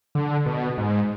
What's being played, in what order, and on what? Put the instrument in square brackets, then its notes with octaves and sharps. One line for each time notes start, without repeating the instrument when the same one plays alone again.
[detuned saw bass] D3
B2
G#2